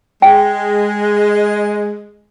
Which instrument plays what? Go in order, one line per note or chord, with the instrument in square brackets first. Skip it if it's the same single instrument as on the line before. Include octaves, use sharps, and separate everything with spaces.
[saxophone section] G#3 [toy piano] G5